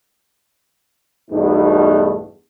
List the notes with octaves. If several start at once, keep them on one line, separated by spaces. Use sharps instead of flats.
B1 E2 G2 B2 A3 D#4